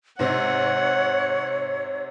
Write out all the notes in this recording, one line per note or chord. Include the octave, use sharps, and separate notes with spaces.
G#2 C3 C#5 F#5